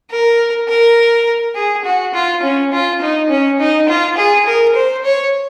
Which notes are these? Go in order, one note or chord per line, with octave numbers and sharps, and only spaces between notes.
A#4
A#4
G#4
F#4
F4
C#4
F4
D#4
C#4
D#4
F4
G#4
A#4
C5
C#5